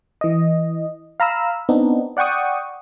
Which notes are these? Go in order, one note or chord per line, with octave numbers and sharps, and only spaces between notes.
E3 D#5
F5 A#5 B5 E6
B3 C4 D4 D#4
D5 F#5 G5 C#6 D#6